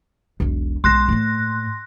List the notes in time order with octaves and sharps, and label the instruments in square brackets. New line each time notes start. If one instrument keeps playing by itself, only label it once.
[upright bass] E1 B1
[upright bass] B1 G#3 [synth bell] C6 F#6 A#6
[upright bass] A2 A#3